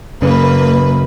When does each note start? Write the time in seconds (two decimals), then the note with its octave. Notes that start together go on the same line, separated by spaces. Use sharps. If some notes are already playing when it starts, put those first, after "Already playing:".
0.22 F#2 C#3 A#3 B4